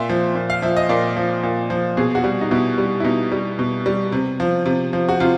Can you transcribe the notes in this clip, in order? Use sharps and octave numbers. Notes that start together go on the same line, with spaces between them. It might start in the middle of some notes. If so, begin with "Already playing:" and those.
Already playing: A#2 E5
F3
A#2
F5
F3 E5
D#5
A#2 D5
F3
A#2
F3
B2 G#4
F#4
G3
D#4
B2 E4
G3
E4
B2 D#4
G3
B2
G3
C3
F3
C3
F3
F#4
C3 F4